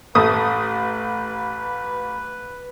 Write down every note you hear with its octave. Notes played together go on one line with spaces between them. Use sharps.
A1 A3 B4 D#6